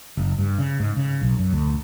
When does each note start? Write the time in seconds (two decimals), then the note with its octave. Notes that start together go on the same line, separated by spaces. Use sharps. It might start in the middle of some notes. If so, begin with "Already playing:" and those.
0.17 F#1
0.38 G2
0.58 C#3
0.80 G#2
0.97 C#3
1.21 B1
1.39 F#2
1.53 D2